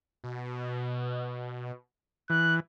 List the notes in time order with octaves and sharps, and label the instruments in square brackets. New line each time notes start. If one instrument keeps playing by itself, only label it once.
[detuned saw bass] B2
[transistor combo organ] E3 [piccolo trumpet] F#6